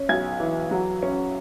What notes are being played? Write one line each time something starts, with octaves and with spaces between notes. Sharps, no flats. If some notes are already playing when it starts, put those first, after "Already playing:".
Already playing: C#4
B1 G#6
E3
F#3
C#4